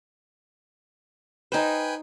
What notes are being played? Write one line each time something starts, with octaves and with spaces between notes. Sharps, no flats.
D#4 B4 C5 G5 G#5